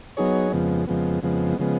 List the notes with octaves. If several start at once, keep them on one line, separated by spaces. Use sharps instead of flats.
F#3 B3 D#4 G#4 C#5
F2 C#3 F3 G#3 B3
F2 C#3 F3 G#3 B3
F2 C#3 F3 G#3 B3
C#3 F3 G#3 B3